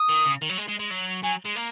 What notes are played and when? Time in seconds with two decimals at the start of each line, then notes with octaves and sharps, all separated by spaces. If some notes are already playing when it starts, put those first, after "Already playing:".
Already playing: D#6
0.09 D#3
0.25 C#3
0.42 D#3
0.50 F#3
0.58 G#3
0.68 G#3
0.80 G#3
0.91 F#3
1.23 F#3 G#5
1.46 G#3
1.56 A#3